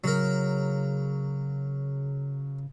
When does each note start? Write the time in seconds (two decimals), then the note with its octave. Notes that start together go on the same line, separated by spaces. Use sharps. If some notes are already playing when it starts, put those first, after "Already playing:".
0.04 C#3 F#3 A#4